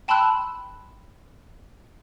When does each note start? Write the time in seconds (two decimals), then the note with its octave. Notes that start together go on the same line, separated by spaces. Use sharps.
0.08 G5 A5 B5 C6 E6 F#6